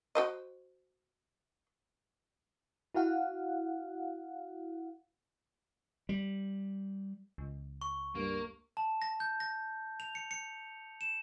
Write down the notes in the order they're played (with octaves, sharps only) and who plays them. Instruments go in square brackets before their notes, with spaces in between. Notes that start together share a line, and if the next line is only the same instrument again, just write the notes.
[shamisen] F#4 C5 D#5
[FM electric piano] E4 F#4 F5 F#5
[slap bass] G3
[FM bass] C#2
[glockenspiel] C#6
[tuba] G2 [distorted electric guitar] A#3
[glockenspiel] A5
A#6
G6
A#6
F7
C#7
C#7
E7